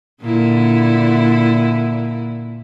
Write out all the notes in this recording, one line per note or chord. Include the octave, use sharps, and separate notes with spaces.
A#2 D3 E4